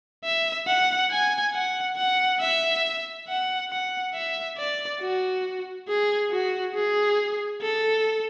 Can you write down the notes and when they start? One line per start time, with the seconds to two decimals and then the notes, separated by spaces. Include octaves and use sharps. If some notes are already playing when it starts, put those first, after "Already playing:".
0.24 E5
0.67 F#5
1.11 G#5
1.53 F#5
1.96 F#5
2.40 E5
3.27 F#5
3.70 F#5
4.14 E5
4.57 D5
5.01 F#4
5.88 G#4
6.31 F#4
6.75 G#4
7.61 A4